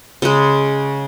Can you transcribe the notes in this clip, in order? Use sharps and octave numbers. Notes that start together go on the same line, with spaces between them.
C#3 G#3